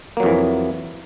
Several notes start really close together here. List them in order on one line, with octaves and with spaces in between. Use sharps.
A#3 F#3 F2 E3